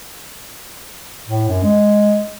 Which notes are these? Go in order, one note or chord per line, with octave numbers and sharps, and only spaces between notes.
A2
F#2
G#3